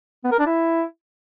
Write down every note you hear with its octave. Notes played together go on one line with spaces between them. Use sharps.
B3
A#4
D4
E4